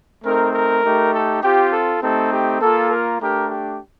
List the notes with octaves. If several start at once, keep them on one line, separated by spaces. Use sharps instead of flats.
A3 C4 D#4 A#4
A#4
A3 D#4 G4
A4
C4 F4 G4
A4
A3 C4 D#4 G4 A4
G4
A#3 F4 A4
A#4
A3 D4 G4 A#4
G4